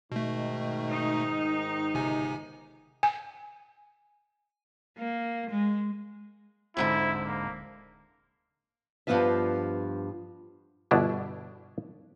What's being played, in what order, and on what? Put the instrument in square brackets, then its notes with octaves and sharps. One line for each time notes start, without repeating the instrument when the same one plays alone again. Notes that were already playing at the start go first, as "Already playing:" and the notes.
[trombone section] G#2 D#3 [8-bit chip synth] B2 A3
[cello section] D#4
[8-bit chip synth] G1 C3 G#5
[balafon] G#5
[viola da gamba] A#3
G#3
[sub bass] D1 [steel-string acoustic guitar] F2 G#2 D3 [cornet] E4
[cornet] A#3
[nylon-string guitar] G2 B2 F3 B3 F4 E5
[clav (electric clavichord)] G1 B2 D4 E4